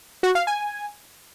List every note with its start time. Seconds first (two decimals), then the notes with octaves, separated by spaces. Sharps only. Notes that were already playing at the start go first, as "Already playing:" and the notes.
0.23 F#4
0.35 F5
0.47 G#5